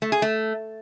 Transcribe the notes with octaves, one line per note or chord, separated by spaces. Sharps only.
A3
G#4
A3